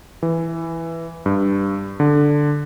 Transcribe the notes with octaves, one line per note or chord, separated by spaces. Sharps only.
E3
G2
D3